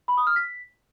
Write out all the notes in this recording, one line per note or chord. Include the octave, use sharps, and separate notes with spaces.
B5
D#6
F6
B6